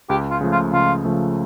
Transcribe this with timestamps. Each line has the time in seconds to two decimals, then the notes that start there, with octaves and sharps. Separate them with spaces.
0.09 C#2 G4
0.31 F4
0.41 C#3 F3 A3
0.52 F4
0.73 C#2 F4
1.05 C#3 F3 A3